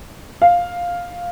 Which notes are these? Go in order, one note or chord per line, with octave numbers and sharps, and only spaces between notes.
F5